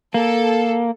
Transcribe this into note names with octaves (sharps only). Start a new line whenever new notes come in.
A#3 A4